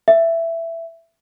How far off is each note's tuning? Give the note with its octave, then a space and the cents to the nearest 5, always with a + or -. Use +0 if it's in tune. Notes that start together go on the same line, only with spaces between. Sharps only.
E5 +10